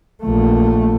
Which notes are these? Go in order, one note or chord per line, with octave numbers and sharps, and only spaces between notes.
A#1 A3